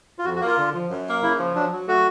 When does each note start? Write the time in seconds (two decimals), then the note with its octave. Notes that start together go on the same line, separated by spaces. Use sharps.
0.19 F4
0.25 F2 F#4
0.36 F#4
0.42 A#3
0.47 F4
0.58 D3
0.74 F3
0.90 F#2
1.07 A#3
1.23 C#3 E4
1.39 F3
1.55 F#3 D4
1.71 F#3
1.88 A3 F#4